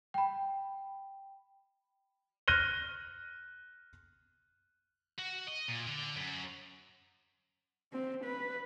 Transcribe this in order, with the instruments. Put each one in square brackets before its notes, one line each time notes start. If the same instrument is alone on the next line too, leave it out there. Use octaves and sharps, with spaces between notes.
[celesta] G5 B5
[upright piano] F6 F#6 A#6 D#7 G7
[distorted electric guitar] F#4
D#5
A#2
D3
F#2
[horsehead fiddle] C4
B4